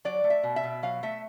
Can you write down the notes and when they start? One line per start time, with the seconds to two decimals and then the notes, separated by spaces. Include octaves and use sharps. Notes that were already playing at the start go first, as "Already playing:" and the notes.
0.05 F#3 D5
0.24 A3
0.30 E5
0.43 B2
0.56 E5
0.64 B2
0.83 F#3 F5
1.03 A3 E5